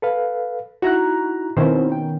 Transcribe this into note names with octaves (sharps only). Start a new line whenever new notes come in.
A4 B4 F5
D#4 E4 F#4 A#5 F#6
B2 D#3 C4 C#4 E4 C5
G5